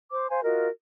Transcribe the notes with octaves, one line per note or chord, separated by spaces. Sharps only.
C5 D6
C5 F5 G#5
F4 F#4 A#4 D#5